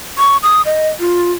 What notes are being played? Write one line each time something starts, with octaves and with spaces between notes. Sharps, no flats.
C#6
D#6
D#5
F4